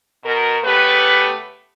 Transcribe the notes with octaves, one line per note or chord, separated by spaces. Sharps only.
B2 A#4
C#3 A3 B3 G4 B4